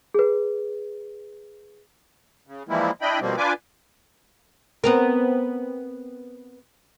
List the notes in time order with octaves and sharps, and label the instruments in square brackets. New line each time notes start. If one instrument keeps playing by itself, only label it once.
[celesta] G#4 B4
[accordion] C#3
E3 F3 G3 G#3 A#3 E4
D4 E4 D#5 G5 B5
B2 F3 G3 A#3 C4
D4 F4 B4 G#5 D6
[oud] B3 C4 A#4